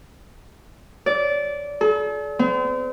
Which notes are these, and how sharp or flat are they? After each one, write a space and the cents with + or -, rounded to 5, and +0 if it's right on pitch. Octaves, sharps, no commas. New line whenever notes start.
D5 -20
A4 -45
C4 -40